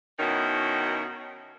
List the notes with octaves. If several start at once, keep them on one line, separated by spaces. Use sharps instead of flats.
B2 D#3 C#4 D#4 E4 F#4